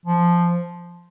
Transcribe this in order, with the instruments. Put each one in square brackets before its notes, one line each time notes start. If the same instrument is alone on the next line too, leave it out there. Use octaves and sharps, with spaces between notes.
[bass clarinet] F3